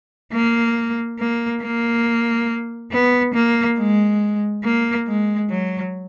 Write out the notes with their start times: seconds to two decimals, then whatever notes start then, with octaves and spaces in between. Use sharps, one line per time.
0.33 A#3
1.19 A#3
1.62 A#3
2.92 B3
3.34 A#3
3.78 G#3
4.64 A#3
5.07 G#3
5.50 F#3